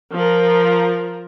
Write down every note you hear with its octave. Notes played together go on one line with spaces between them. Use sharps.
F3 A#4